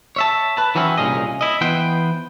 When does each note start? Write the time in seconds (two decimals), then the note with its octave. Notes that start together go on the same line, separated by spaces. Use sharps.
0.16 C#5 E5 A5
0.57 B4 A5
0.75 E3 F#3 C4 C#4 E4
0.98 C2 A#2 D3 C#4 G#4 D#5
1.41 E4 D#5
1.61 E3 B3 B4 C5 G5